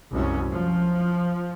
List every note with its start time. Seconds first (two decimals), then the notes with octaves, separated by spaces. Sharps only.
0.11 C2 F#2 G#3 C#4
0.49 F3